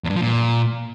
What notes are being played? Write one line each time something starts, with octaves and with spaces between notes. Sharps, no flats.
E2
G2
F3
A#2